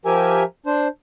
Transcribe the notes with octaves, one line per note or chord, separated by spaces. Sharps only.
F3 G4 A#4 E5 G#5
D4 C5